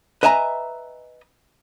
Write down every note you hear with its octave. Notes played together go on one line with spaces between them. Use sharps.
B4 D#5 E5 G#5 A#5